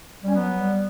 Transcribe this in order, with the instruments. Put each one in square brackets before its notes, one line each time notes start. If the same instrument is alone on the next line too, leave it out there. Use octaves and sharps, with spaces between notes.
[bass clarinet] G3 [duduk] C#4
[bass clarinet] F#3 [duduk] B3
[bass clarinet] G3